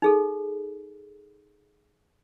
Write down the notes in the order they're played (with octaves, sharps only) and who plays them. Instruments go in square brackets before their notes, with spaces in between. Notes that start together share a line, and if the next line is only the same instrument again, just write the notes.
[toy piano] D#4 G#4 A4